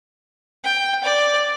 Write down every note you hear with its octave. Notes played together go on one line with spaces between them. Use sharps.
G5
D5